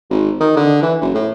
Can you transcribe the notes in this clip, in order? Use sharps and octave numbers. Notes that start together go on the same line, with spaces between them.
G#1
D#3
D3
E3
F#1
A2